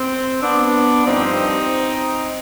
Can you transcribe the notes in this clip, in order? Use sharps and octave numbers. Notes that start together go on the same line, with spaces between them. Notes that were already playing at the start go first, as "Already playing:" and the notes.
Already playing: C4
B3 D4
G2 F3 C4 D#4